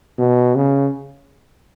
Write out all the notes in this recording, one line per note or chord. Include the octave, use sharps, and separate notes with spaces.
B2
C#3